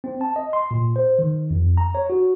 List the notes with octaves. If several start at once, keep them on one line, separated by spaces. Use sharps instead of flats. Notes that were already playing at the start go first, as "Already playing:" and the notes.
C4
A5
D#5
C6
A#2
C5
D#3
F2
A#5
C#5
F#4